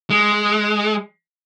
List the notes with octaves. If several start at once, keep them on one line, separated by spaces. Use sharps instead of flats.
G#3